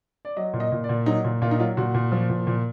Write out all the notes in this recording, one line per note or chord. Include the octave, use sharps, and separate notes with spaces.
D5
F#3 D#5
A#2
D#5
A#2
D5
A#2
F#3 D#4
A#2
A#2 F4
D#4
F#3 F4
A#2 F#4
A#2
F3
A#2
A#2